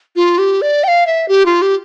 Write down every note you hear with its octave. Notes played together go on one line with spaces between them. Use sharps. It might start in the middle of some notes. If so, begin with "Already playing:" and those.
F4
G4
D5
G5
F5
E5
G4
F4
G4